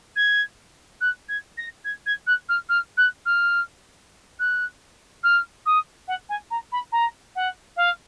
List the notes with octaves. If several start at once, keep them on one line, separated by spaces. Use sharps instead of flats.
G#6
F#6
G#6
A#6
G#6
G#6
F#6
F6
F6
F#6
F6
F#6
F6
D#6
F#5
G#5
A#5
B5
A#5
F#5
F5